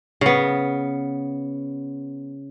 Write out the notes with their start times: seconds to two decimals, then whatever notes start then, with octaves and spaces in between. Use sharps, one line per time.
0.21 C#3 B3